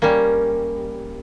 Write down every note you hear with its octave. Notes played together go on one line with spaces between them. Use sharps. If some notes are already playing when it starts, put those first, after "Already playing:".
G3 A#3 C#4